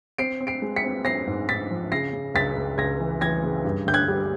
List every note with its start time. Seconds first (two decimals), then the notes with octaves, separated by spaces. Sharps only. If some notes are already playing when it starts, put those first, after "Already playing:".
0.18 C4 C7 D7
0.40 C4
0.47 C7 D7
0.62 G#3
0.76 B6 C#7
0.84 C4
1.05 C4 A#6 C7
1.27 G#2
1.49 G#2 A6 B6
1.70 F3
1.92 C#3 A#6 C7
2.13 C#3
2.34 C#2 A6 B6
2.56 C#2
2.78 C#2 G#6 A#6
3.00 E3
3.21 E3 G#6 A#6
3.43 C#3
3.65 G2
3.87 D3 G6
3.94 F#6 G#6
4.08 G3